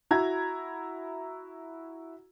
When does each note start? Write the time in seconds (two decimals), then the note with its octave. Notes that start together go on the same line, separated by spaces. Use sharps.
0.11 E4 F#4 A#5 G#6